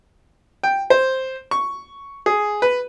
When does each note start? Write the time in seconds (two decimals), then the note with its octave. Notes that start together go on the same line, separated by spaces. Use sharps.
0.63 G5
0.90 C5
1.51 C#6
2.26 G#4
2.62 B4